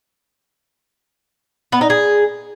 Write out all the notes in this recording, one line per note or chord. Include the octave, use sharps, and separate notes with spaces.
B3
D#4
G#4